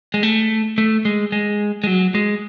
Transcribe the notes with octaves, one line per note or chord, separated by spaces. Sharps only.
G#3
A3
A3
G#3
G#3
G#3
F#3
G#3